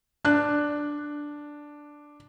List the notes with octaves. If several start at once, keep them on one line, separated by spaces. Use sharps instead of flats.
D4 F#6